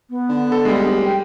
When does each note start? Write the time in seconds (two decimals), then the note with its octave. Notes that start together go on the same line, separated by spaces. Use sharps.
0.10 B3
0.29 D3
0.52 A4
0.65 D2 G3 G#3
0.84 F1
1.05 G5